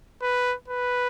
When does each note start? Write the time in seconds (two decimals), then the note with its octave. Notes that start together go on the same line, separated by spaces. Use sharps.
0.22 B4
0.68 B4